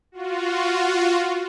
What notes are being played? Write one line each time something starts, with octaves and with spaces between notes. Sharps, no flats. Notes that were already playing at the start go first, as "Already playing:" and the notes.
F4 F#4